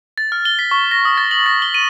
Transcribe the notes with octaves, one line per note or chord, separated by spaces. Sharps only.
A6
F6
G7
B6
C#6
A#6
D#6
A6
F#7
A#6
G7
D#7